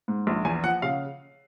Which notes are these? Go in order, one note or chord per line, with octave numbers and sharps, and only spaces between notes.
G#2
A#1
E2 G#5
F3 F#5
C#3 F5